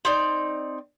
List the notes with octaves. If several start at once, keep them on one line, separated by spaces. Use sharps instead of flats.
C4 D#4 D5